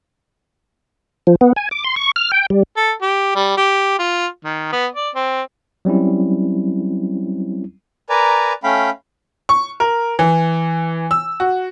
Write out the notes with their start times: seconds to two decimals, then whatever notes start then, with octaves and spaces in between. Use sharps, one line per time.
1.27 F3
1.41 B3
1.56 G#5
1.71 D6
1.84 C6
1.96 C#6
2.16 F6
2.32 G5
2.50 G3
2.77 A4
3.02 G4
3.36 G3
3.57 G4
3.99 F4
4.44 D#3
4.72 B3
4.95 D5
5.15 C4
5.85 F#3 G3 C4 C#4 E4
8.10 A#4 B4 D5 G#5 A#5
8.64 A3 C#4 F5 G5 B5
9.49 C#6
9.80 A#4
10.19 E3
11.11 E6
11.40 F#4